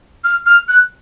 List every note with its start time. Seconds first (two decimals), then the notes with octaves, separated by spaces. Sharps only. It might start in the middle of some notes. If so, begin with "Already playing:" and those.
0.24 F6
0.46 F6
0.68 F#6